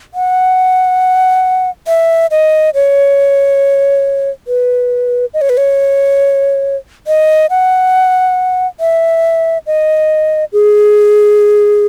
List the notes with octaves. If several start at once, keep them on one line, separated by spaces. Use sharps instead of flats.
F#5
E5
D#5
C#5
B4
D#5
C#5
B4
C#5
D#5
F#5
E5
D#5
G#4